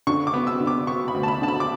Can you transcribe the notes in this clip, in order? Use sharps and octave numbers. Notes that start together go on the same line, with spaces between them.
D3 C#6
D6
B3
E6
D3
D6
B3 C#6
B5
D2
A5
B5
D3 A5
B5
D6